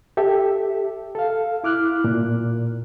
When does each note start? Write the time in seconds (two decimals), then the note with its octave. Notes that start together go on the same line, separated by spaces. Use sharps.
0.17 G4 A4 E5
1.15 A4 F5
1.64 E4 D6 F6 F#6
2.04 A#2